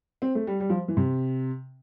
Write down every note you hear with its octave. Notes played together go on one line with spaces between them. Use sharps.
C4
A3
G3
G3
F3
E3
C3